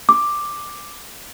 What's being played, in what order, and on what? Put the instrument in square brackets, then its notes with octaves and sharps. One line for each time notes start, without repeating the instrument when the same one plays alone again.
[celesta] D6